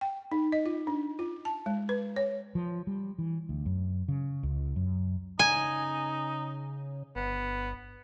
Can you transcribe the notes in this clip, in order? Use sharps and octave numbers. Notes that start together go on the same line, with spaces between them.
G5
D#4
D#5
F4
D4
F4
A5
G#3
B4
C#5
F3
G3
E3
D2
F#2
C#3
C#2
F#2
C#3 D#4 G#5
G1 B3